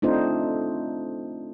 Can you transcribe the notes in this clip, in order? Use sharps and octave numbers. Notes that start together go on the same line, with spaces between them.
A3 C4 D4 D#4 F4 C5